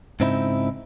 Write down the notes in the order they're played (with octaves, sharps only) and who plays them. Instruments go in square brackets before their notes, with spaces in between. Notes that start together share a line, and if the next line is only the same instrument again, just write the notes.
[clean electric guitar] G#2 C#3 C4 D#4 E4